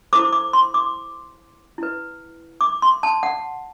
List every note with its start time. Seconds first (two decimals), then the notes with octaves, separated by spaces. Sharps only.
0.13 E4 A4 C5 D6
0.33 D6
0.53 C6
0.74 D6
1.78 E4 B4
2.61 D6
2.82 C6
3.03 A5
3.23 F#5